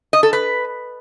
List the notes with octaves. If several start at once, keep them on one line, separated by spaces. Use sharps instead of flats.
D#5
A4
B4